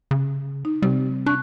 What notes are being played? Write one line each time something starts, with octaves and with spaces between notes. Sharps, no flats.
C#3
D#4
C3 G3 C4
D4 C#6 F#6